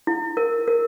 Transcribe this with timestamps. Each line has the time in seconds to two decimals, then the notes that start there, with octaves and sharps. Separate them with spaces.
0.07 E4
0.37 A#4
0.68 A#4